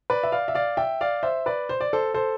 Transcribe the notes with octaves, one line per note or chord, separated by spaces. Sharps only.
B4 D5
E5
D5 F5
E5
D5 F5
E5 G5
D5 F5
C5 E5
B4 D5
C5
D5
A4 C5
A4 C5